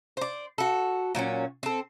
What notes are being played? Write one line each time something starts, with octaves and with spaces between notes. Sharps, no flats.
C5 D5
F#4 A4
A#2 F#3 B3 C#4
C4 A4